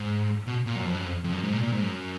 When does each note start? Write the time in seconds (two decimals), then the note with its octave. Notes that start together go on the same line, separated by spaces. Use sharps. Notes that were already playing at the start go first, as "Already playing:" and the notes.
Already playing: G#2
0.47 B2
0.66 A#2
0.76 F#2
0.85 F2
0.95 F#2
1.05 F2
1.24 F2
1.33 F#2
1.44 G#2
1.53 A#2
1.63 A#2
1.72 G#2
1.82 F#2